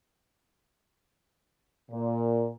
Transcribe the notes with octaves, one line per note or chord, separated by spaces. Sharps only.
A#2